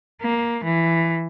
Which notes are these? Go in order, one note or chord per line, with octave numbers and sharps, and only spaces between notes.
A#3
E3